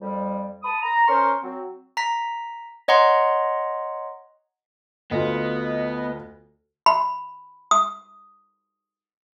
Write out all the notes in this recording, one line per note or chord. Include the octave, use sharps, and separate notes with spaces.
F2 G3
A5 B5 D#6
A#5
C#4 A#4 C5 C6 C#6
F#3 C4
A#5 B6
C#5 D#5 F#5 A#5 C6
D2 B3 F4 D#5
B5
D#6